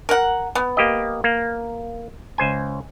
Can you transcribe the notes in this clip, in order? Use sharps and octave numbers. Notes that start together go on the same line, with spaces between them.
A#4 F#5
B3
A#3 G4 D#5
A#3
C#2 C5 G#5